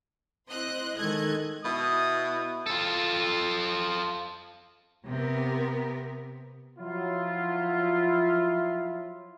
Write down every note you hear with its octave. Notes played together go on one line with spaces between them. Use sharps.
C4 E4 C5 D#5 F#6
D#3 G#3 A4 D#5 F#6 G#6
B2 E4 D#6
F4 A4
C3 B3 G4 A#4
F3 F#3 E4 F4